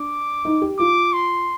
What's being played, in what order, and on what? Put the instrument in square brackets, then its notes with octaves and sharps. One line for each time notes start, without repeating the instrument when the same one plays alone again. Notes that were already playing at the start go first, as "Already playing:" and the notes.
Already playing: [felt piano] D4 [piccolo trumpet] D6
[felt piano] D#4
G4
[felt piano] F4 [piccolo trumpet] D6
[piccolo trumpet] C6